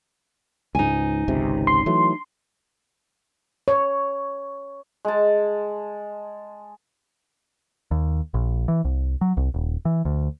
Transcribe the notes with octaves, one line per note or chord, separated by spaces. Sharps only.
C#2 G#2 D#4 G#5
G#1 C#2 C3
C6
E3 F#3 A3
C#5
G#3 A5
D#2
A#1
E3
C2
F#3
C2
D#1
E3
D2